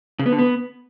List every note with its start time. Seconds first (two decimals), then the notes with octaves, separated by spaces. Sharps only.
0.19 C#3
0.26 B3
0.32 D3
0.39 B3